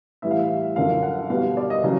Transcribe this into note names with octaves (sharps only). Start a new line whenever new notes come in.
A2 E3 G3 E5
F5
E5
F#2 D3 F3 F5
F#5
B2 G3 F5
D5
D#5
C#3 F#3